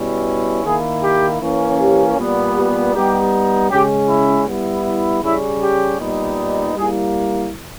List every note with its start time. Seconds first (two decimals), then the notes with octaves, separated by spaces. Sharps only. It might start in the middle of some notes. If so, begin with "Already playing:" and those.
Already playing: B2 G3 C#4 E4
0.64 D#3 A#3 E4 G#4
1.03 G4
1.41 E3 A#3 C#4
1.80 G4
2.18 A#2 G3 B3
2.56 G4
2.93 G3 B3 D#4 G4
3.70 C#3 G#3 C#4 G4
4.08 E4
4.47 G3 B3 E4
5.23 C#3 G3 C#4 E4
5.61 G4
5.99 A#2 G3 B3 D#4
6.76 G3 A#3 E4 G#4